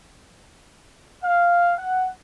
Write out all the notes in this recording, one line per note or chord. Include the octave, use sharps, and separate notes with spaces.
F5
F#5